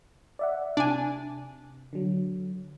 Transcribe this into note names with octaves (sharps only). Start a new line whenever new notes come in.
D5 E5 F#5
C3 D4 G#5
D3 F#3